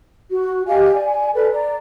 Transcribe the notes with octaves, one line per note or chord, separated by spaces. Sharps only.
F#4
G4 D#5 F5 G#5
D5 G#5
A4 B4 D5
D5 A#5